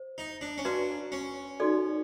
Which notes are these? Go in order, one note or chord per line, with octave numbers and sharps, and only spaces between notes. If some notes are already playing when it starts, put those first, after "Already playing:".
Already playing: C5
D#4
D4
C#4
D4 F#4 B4 D5 F5 A#5
C#4
D#4 F#4 A4 D5